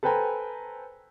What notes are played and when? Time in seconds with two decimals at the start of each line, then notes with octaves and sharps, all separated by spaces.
0.03 A4 B4 C5 G5 G#5 A#5